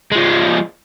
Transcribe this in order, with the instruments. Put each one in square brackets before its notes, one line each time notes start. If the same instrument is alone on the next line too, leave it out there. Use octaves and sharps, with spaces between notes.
[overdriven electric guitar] F3 G#3